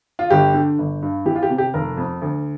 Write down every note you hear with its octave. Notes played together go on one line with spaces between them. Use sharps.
F4
G1 G4
D3
G1
G2
E3 G4
F4
G4
C3
G4
F1 A#4
F2
D2